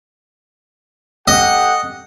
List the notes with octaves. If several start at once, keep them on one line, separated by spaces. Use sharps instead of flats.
G4 A4 D#5 F#5